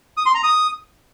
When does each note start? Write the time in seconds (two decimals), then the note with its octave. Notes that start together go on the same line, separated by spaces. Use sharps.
0.17 D#6
0.26 C6
0.35 A#5
0.43 D#6